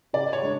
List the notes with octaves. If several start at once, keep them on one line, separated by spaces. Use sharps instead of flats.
C#3 D5
C#5
G#3 D4